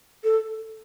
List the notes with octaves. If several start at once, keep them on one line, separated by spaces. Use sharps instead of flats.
A4